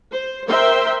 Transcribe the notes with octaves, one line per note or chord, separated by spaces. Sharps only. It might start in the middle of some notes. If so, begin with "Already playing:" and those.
C5
A#4 C5 E5 G5 C6